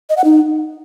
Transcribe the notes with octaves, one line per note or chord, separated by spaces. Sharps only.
D#5
F#5
D#4